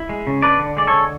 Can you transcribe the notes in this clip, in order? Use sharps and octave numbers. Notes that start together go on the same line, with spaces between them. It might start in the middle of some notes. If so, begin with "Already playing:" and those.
Already playing: E4
G#3
C#3
D4 B4 D5
D3
G#3 D5
A4 C#5
D3